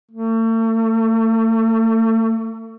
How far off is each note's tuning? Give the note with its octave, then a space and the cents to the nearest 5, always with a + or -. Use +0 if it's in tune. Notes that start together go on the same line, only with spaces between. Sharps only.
A3 +40